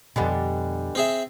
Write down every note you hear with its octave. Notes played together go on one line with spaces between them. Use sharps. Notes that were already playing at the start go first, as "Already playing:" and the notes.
F2 B2 D3 G3 B3 D#5 G#5 B5
C4 G#4 E5